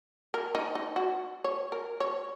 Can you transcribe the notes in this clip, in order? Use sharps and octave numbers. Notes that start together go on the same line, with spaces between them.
A#4
D#4
D#4
F#4
C#5
A#4
C#5